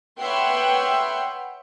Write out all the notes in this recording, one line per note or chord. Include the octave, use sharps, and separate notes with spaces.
B4 C#5 E5 F#5 G5 C6